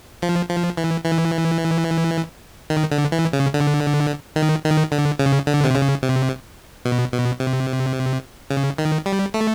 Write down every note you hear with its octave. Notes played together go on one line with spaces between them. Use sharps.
F3
F3
E3
E3
D#3
D3
E3
C#3
D3
D#3
D#3
D3
C#3
D3
C3
C#3
C3
B2
B2
C3
C#3
D#3
G3
A3